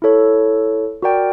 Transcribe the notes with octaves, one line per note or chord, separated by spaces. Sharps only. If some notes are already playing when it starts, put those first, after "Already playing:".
E4 A4 C#5
F#4 A#4 D5 G5